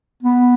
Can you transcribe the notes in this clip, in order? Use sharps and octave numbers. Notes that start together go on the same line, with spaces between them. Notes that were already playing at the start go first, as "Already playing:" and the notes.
B3